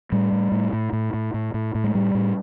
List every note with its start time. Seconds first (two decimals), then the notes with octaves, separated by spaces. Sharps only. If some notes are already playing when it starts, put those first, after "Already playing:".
0.12 A2 G3
0.32 A2
0.52 A2
0.73 A2
0.93 A2
1.14 A2
1.34 A2
1.54 A2
1.75 A2
1.84 G#3
1.94 A2 G3
2.15 A2